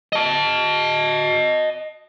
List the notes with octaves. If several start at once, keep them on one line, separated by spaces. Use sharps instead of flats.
D#5 A5